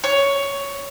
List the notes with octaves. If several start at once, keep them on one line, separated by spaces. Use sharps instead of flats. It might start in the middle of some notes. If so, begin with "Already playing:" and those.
C#5